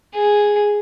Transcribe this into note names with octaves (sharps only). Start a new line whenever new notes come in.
G#4